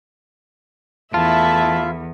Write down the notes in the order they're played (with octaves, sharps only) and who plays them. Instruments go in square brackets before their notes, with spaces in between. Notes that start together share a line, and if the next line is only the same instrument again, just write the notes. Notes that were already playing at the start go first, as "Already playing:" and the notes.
[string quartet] E2 [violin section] A3 E4 E5 [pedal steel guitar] F4 [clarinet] A5